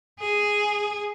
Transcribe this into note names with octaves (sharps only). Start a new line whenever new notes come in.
G#4